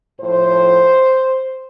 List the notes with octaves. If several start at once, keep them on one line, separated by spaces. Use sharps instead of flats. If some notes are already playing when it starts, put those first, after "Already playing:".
A2 F3 C5